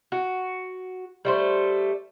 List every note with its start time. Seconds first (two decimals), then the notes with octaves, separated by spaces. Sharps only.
0.12 F#4
1.25 G3 A3 C5